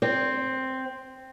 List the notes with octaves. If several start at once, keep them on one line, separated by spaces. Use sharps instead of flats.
C4